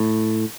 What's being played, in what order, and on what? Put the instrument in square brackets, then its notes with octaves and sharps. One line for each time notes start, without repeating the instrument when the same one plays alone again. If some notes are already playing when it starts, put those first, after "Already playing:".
Already playing: [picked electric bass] A2